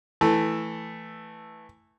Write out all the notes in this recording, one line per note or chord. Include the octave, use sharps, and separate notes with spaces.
E3 A3 A4